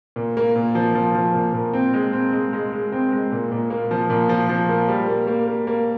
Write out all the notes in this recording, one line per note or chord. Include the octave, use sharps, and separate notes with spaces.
A#2
A#3
A#2
F3
F3
F3
A#2
A#2
C4
G#3
C4
G#3
G#3
G#3
C4
G#3
A#2
A#2
A#3
F3
A#2
F3
F3
A#3
G3
A#3
A#3
A#3
A#3